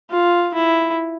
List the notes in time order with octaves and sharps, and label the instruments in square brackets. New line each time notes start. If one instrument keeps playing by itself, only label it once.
[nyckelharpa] F4
E4